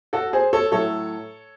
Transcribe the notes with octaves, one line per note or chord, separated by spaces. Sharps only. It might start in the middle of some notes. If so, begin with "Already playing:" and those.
F#4 A4
G#4 C5
A4 C#5
A2 F#3 A3 A4 C#5